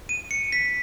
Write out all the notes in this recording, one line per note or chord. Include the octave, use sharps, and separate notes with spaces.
D#7
C#7
B6